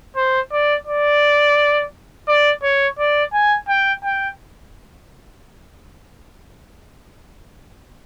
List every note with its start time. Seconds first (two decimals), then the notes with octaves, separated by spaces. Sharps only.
0.16 C5
0.52 D5
0.87 D5
2.28 D5
2.63 C#5
2.99 D5
3.33 G#5
3.69 G5
4.05 G5